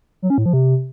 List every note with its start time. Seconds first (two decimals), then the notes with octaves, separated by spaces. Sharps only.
0.22 F#3
0.30 C#4
0.38 A2
0.46 F3
0.53 C3